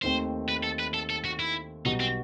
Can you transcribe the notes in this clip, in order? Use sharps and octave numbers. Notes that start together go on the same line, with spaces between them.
D#2 D#3 A3 C4 C5
B4
A4
B4
A4
A4
F#4
E4
B1 B2 G3 B3 D#4 F#4
C4